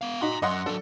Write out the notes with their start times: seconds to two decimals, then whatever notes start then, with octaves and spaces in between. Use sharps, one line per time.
0.01 B3 F5
0.22 D#4 F#4 A#5 C6
0.42 F#2 D#5 F#5 C6
0.66 F#3 D4 A4